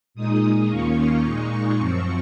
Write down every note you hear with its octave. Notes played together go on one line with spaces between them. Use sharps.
A#2 G#3 D#4 D#6
D#2 D#3 A#3 C#4 F4 C#6
A#2 G#3 D#4 C#6
F#2 F3 C4 C#6